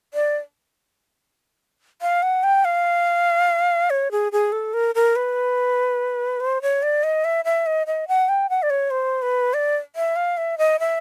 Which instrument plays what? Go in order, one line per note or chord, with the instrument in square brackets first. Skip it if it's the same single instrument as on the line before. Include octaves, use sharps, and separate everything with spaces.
[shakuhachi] D5
F5
F#5
G5
F5
C#5
G#4
G#4
A4
A#4
A#4
B4
C5
C#5
D5
D#5
E5
E5
D#5
D#5
F#5
G5
F#5
D5
C#5
C5
B4
D5
E5
F5
E5
D#5
E5